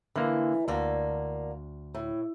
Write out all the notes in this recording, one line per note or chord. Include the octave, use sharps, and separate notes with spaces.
D3 E3 A#3
D2 D3 A#3 D5
A2